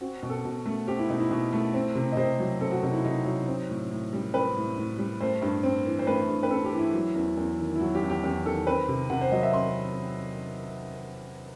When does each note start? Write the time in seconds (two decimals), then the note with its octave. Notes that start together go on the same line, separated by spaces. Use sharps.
0.01 C4 F#4
0.23 B2
0.30 A4
0.45 B2
0.66 A3
0.87 C4 G4
0.99 E4
1.09 B2 D#4
1.20 E4
1.31 B2
1.53 A3
1.74 C4
1.95 C3
2.12 D#5
2.17 C3 C5
2.39 F#3
2.60 C4 A4
2.72 F#4
2.83 C3 D#4
2.93 E4
3.04 C3 D#4
3.25 F#3 D#4
3.47 C4
3.70 A2
3.90 A2
4.13 G3
4.34 C4 B4
4.56 A2
4.78 A2
4.98 G3
5.21 A3 C5
5.42 G2
5.63 C4
5.85 E3
5.99 C5
6.07 A3 B4
6.28 G2
6.43 B4
6.51 C4 A4
6.65 G4
6.72 E3
6.79 E4
6.94 F#3
7.15 E2
7.37 E2
7.59 D#3
7.75 E4
7.80 F#3 F#4
7.95 G4
8.03 E2
8.10 G4
8.23 E2 G4
8.45 D#3 A4
8.67 C4 B4
8.88 C3
9.10 C3 F#5
9.21 C5
9.32 F#3 D#5
9.43 E5
9.53 C4 C6